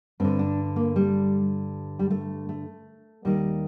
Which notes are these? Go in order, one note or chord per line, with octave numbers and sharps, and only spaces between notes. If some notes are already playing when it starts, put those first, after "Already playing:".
G2 D3 C4
D4
A#3
G3
G3
A3
A3
D#2 D#3 G3